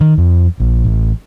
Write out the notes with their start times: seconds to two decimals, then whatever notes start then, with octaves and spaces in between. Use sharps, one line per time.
0.01 D#3
0.18 F2
0.60 A#1
0.85 A1